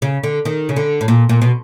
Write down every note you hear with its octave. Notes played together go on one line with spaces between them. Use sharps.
C#3
D3
D#3
C#3
D3
A2
A#2
A#2
B2